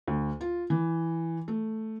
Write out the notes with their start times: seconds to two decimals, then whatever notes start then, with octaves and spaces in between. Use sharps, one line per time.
0.07 D2
0.41 F4
0.70 E3
1.48 A3